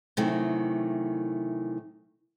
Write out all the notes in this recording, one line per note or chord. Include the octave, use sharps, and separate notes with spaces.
C3 D#3 E3 F#3 A3